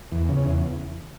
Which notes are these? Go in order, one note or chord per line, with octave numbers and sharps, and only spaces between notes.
E2
C#3
E2